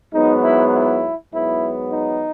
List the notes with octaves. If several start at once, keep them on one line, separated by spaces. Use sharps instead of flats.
G#2 F#3 B3 D#4
E4
E4
G#2 F#3 B3 E4
D#4